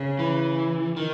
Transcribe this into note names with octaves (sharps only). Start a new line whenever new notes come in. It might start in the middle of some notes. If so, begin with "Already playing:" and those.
Already playing: C#3
E3
D#3